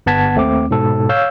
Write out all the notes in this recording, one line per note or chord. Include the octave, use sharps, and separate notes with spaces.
G1 B3 F#5 A5 G#6 B6
D#2 A3 C4 D6
G#2 B2 A4
C#5 F5 E6 G6